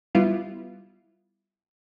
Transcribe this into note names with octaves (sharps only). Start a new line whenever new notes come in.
G3 B3 E4 F4